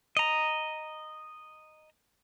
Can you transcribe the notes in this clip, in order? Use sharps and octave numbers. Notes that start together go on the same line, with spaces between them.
D#5 A#5